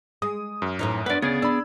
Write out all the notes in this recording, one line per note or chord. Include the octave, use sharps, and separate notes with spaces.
G#3 D#6
F#2
A2 E3 D#4
B3 D4 B4 D5
D2 C#3 B3 G#4 D5 G#6
D4 B5 E6